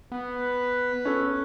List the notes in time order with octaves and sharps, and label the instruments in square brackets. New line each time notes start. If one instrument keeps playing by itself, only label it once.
[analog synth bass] B3 [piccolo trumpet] B4
[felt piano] C#4 A4